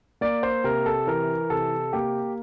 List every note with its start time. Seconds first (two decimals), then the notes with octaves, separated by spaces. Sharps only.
0.21 A#3 D5
0.43 C5
0.64 C3 A#4
0.86 A4
1.07 E3 A#4
1.50 C3 A4
1.93 A#3 G4